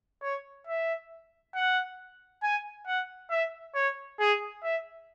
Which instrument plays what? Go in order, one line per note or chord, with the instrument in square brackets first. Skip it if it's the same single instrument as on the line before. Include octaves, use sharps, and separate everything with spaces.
[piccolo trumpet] C#5
E5
F#5
G#5
F#5
E5
C#5
G#4
E5